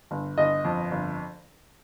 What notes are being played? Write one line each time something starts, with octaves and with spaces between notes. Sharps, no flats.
G1
G1 D#5
F2
G1